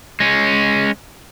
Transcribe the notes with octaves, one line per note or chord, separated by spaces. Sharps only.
G#3 C#4